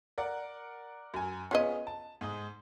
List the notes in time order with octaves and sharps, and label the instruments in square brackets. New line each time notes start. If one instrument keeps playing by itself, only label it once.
[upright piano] A#4 D5 F#5
F#2 G#5
[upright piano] B3 C#4 G#4 [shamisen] F4 B4 D#5
[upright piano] A5
G#2 G#3 D#6